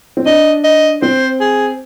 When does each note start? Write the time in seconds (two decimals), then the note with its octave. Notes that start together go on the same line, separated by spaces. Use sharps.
0.17 C4
0.26 D4 D#5
0.64 D#5
1.02 C4 C5
1.41 G#4